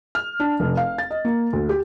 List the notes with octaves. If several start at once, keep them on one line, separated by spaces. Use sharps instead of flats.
F6
D4
F1
F5
A6
D#5
A#3
D2
G4